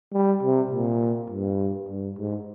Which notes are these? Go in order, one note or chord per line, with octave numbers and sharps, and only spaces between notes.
G3
C3
A#2
G2
G2
G#2